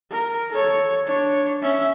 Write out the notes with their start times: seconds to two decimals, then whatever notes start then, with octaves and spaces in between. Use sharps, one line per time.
0.11 A#4
0.50 A4 C#5
1.06 D4 C#5
1.62 C#4 E5